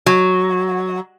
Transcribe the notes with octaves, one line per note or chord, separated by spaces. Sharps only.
F#3